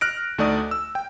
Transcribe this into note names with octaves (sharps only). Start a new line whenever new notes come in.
F6 F#6 A#6 D7
D2 A3 D#4 D5 D#6
E6
G5